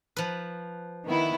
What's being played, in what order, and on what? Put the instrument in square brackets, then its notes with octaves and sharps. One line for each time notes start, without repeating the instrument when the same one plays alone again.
[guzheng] F3 B4
[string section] D#3 B3 E4